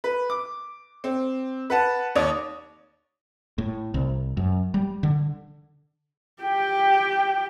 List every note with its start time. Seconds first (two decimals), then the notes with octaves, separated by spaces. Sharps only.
0.04 B4
0.30 D6
1.04 C4
1.70 B4 F#5 A5
2.15 D#2 C#5 D5 D#6
3.58 A2
3.94 C2
4.37 F#2
4.74 G3
5.03 D3
6.42 G4 G5